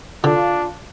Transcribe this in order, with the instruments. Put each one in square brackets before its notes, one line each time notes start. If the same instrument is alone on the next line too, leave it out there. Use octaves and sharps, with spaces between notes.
[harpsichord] D3 [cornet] D4 [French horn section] F4